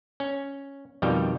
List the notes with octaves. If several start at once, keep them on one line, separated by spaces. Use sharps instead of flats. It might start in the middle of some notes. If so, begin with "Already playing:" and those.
C#4
F2 B2 D#3 G3 G5